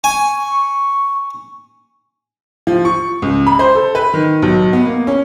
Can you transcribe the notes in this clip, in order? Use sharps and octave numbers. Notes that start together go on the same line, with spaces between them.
G#5 C#6
F3
C#6
C#2
B5
C5
A4
B4
D#3
B1
B3
A#3
C#4